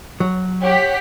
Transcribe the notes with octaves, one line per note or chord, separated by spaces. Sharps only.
F#3
G4 C#5 F#5 B6